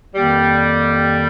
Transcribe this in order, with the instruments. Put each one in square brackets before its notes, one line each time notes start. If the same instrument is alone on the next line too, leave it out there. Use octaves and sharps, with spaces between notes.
[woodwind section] F2 D#3 A#3 [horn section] G3